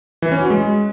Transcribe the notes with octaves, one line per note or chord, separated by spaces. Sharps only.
E3
C#4
F#4
G#3